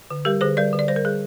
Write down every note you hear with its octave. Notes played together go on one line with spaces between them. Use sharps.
D3
G3 G4 A#4
D3 G#4 C5
G3 A#4 D5
D3
D5
G3 C5
A#4
G3 G#4